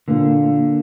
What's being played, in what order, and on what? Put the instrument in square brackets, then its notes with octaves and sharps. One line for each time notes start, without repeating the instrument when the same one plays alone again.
[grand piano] A#2 A#3 F4 [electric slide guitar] D3